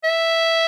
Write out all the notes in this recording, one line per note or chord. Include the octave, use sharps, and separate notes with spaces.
E5